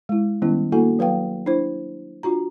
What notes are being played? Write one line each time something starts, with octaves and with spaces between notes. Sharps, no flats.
G#3 E4
D#3 G3 B3 C#4 E4
A#3 D4 E4 F#4 A4 G#5
F#3 B4 F5 G5
D4 E4 C5
D4 F4 F#4 A#5